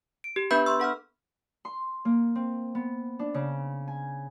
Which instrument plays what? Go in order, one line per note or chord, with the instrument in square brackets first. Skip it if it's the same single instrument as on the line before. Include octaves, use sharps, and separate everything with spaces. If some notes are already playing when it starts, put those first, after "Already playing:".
[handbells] D7
G4
B3 D4 B4 E5 B5 G6
C6 C#6 E6
A4 F#5 B5 F6
[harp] C6
A#3
C4
B3
D4
C#3
G#5